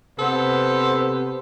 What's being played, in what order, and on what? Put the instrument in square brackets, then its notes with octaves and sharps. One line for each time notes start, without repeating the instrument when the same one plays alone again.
[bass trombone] C3 [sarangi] B3 [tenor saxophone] A4 [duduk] C5